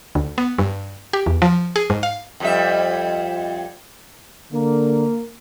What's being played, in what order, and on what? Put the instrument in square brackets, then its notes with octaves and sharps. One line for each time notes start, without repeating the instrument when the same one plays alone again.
[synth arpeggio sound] D2
B3
G2
G4
E2
F3
G#4
G#2
F5
[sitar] F2 G3 E5
[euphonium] D3 [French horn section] A#3